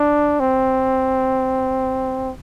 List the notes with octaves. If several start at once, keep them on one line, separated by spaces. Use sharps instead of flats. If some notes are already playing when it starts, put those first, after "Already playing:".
Already playing: D4
C4